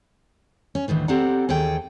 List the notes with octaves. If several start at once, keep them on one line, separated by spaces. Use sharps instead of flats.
C#4
D2 A2 D#3 E3
C4 G4 A4 D5 F#5 A#5
D#2 E3 G#4 A4 G5